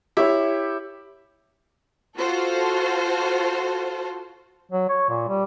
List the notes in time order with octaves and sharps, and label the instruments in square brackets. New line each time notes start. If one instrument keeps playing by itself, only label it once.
[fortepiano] E4 [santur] G4 C#5
[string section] F4 F#4 A4 C5
[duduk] F#3
C#5
A#2
G3